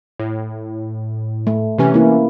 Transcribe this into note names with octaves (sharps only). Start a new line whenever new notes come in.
A2
A3
C3 E3 C#4
A#3 E4